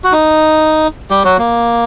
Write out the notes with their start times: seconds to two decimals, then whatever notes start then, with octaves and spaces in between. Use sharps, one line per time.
0.04 F#4
0.12 D#4
1.10 G3 G4
1.24 F#3 F#4
1.39 A#3